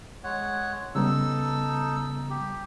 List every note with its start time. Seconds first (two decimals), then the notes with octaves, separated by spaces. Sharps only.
0.24 G#3 C#5 F#5
0.95 C#3 G3 B3 D#4 A4 E6
2.30 G4